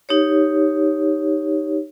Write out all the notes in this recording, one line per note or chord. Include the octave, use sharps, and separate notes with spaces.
D#4 G4 C#5